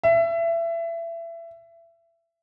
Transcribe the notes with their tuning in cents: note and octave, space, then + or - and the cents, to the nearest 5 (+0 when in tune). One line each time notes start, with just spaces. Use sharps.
E5 +25